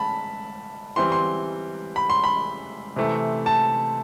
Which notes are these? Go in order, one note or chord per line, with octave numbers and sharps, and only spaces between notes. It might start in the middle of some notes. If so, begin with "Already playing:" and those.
Already playing: A5 B5
E3 G3 C4 C6
C6
B5
C6
B5
C3 E3 A3 C4
A5